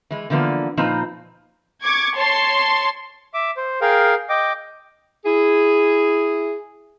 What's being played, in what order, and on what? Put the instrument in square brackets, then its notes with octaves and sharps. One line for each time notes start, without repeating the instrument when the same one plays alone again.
[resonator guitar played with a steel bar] E3 G#3
D3 E3 F3 A#3 B3
A#2 F3 C4 D#4 B4
[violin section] C#6 D6 G#6
C#5 A5 C6
[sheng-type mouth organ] E5 D6
C5
G#4 A#4 F5 G5
D#5 G5 D6
[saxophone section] E4 G#4